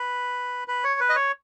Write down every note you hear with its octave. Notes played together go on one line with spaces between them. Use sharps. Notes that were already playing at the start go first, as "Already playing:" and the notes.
Already playing: B4
B4
C#5
B4
D#5
C#5